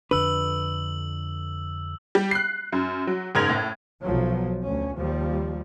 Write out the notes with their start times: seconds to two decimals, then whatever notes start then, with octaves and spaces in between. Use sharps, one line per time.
0.11 F2 D3 D4 B4 E6 F#7
2.15 G3
2.31 F#6 C7
2.72 F#2
3.07 F#3
3.35 F#1 G#2 A#4 G#6 F7
3.49 A2
4.02 B1 F3 F#3
4.63 D2 C#4
4.97 D#2 F3 G3